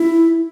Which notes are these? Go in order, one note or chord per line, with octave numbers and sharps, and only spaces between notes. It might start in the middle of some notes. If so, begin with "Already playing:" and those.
Already playing: E4